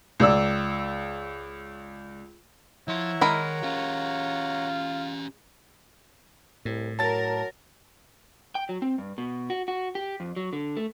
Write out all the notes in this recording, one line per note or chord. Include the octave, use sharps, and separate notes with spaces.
C#2 D5 E6
F3 E4 C#5 F#5 A#5 C6
D#3 G#3 A#4 B5
C#4 F4 G4
C2 A2
F#3 A#4 A5 A6
G5
F#3
C4
G2
B2
F#4
F#4
G4
F2
F#3
D3
A3